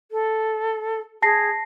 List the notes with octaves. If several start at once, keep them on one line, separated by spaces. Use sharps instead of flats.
A4
G#4 A5 A#6 C7